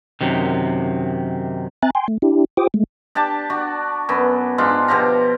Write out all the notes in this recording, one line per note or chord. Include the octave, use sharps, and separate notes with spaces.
F#2 C3 D#3
C4 E5 G#5 A#5 F#6 A6
G5 G#5 C6
A3
D4 E4 G4
F4 G4 C5 G5 D6 D#6
G#3 A3
D4 G4 D5 A5
D4 F#4
F#2 B3
G#2 G#3 D4 F4
B2 F3 G4 A#5